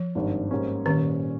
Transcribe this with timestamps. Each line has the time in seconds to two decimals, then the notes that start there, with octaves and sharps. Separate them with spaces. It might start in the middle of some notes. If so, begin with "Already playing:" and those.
Already playing: F3
0.15 G#1 G2 D#3
0.51 G#2 G3 A#3 C#4
0.86 A#2 D#3 G3 C#4